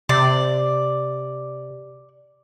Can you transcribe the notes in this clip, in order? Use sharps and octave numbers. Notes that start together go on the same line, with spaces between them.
C3 D5